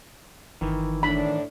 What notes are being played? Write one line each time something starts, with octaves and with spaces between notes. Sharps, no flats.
G1 D#3 E3
A2 D4 B5